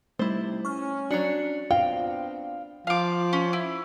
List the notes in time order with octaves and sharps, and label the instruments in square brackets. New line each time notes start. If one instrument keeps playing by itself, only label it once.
[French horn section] C3 D#4 [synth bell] G3 A3 [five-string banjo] E4 C5
[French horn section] C#4 [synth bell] C#6 F6
[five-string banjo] F#3 D4 [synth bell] F#4 C#7
[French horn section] B3 C4 D4 [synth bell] F4 [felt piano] F5 [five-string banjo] G5
[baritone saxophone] F3 [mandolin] F5 D6
[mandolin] C#4
E4